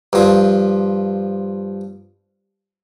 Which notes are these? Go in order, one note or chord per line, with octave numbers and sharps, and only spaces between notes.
G2 F3